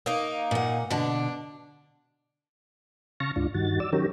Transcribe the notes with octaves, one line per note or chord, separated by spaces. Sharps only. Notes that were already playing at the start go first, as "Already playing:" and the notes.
A#3 D#4
A#2 F#5
B2 D3 D4
C#3 F5 A5 C#6 A#6
D2 G#2 D4 F4
G2 D#3 F#4 A6
D5 E6
D#3 F#3 C#4 G4 A#4